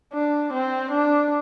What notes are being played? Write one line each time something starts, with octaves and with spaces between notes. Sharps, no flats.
D4
C4
D4